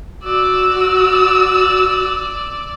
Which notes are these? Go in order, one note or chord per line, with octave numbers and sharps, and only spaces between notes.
F#4 D5 E6